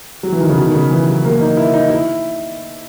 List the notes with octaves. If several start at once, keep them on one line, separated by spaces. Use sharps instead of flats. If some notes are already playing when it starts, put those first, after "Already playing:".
F#3
E3
D#3
C#3
B2
D#3
C#3
E3
F#3
A#3
D#4
E4
D#4
E4